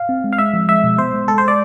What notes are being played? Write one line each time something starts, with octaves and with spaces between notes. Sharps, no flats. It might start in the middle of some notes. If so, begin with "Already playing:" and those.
Already playing: F5
C4
G#3
F5
G#3 E5
F3
G#3 E5
B2
B3 C5
G#3
G#3 A4
C5
D5